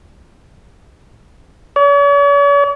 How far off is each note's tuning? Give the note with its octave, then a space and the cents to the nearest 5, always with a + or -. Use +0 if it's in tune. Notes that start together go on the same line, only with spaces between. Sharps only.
C#5 +45